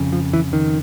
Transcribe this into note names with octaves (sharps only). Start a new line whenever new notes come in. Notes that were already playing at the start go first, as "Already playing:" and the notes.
Already playing: F2 C#3
F3
E3
D#3